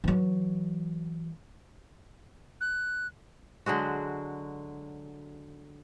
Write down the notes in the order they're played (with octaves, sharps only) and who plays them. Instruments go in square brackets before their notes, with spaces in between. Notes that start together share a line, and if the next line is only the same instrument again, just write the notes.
[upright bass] E3 F#3
[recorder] F#6
[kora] D3 F#3 G#3 F#4